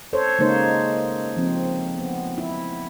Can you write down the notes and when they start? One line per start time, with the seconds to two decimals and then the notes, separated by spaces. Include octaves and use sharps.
0.13 A4 C5 C#5
0.39 C#3 G#3 A#3 D#4 C5 C#5
1.36 F3 C4
1.99 B3
2.38 E4